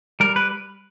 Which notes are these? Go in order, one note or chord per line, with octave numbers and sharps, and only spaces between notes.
G3 A#4
B4